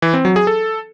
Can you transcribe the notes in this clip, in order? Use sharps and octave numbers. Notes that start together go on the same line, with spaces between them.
E3
C4
F#3
G#4
A4